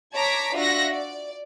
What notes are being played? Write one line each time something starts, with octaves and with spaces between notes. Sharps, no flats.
C#5 A5 A#5 D6 G#6 B6
D4 F4 F#4 E5 F#5 A#6
D5